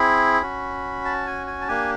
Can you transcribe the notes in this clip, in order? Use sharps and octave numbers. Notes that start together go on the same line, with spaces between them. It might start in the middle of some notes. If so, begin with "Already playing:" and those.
Already playing: C4 E4 G#4 B5
C#4 F#4
A5
G#5
G#5
A5
A#3 D4 G4 G#5